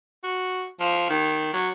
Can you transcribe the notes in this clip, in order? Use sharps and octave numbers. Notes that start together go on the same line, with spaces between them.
F#4
F3
D#3
F#3